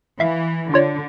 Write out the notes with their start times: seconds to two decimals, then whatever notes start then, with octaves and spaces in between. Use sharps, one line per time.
0.20 E3 E5 F5
0.74 D3 F4 C#5 D5